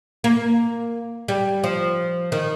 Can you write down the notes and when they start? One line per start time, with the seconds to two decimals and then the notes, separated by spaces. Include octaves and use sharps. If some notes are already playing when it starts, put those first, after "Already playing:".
0.24 A#3
1.28 G3
1.64 F3
2.32 D#3